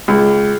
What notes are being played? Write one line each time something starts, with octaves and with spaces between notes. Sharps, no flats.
C#2